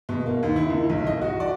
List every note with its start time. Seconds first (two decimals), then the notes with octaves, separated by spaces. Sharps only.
0.09 B2
0.26 A#3
0.43 D#2
0.56 E4
0.70 C#2
0.90 B1
1.07 D#5
1.21 F#4
1.40 D5